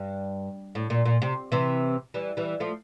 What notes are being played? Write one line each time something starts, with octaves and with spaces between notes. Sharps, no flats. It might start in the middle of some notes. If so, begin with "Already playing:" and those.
Already playing: G2
A2
A#2
A#2
C3
C3 E3
E3 G3
E3 G3
F3 A3